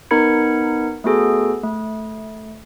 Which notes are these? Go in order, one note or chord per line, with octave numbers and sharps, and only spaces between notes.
B3 D#4 A#4 B5 G#6 C#7
A3 B3 F#4 G#4 A4
A3